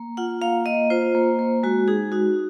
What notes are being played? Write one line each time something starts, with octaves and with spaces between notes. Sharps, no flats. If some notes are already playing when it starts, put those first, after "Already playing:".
Already playing: A#3
F4 F#5
A#3 F5
A#3 D#5
F4 C5
A#3
A#3
G#3 F#4
D#4 G#4
D#4 F#4